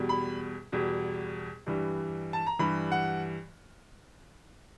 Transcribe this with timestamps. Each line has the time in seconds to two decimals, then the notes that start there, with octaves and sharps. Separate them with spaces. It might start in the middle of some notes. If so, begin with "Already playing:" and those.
Already playing: E2 B2 G3
0.09 B5
0.72 E2 B2 G3
1.67 G2 E3 G3
2.33 A5
2.46 A#5
2.59 G2 E3 G3 B5
2.92 F#5